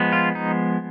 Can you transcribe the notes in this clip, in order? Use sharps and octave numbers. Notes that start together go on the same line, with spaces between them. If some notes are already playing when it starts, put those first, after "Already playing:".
Already playing: F3 G#3 B3
F4
D#4